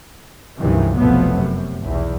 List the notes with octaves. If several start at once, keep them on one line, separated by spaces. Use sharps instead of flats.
C#2 G2 C3 D#3 E3 F#3
F1 B1 F3 F#3 A3 B3
F#2 C3
B1 E2 E3